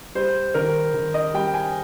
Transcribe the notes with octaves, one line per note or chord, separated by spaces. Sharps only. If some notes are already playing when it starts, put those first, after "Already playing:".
G3 C5
D#3 A#4
D#3
D#5
G3 G5
G#5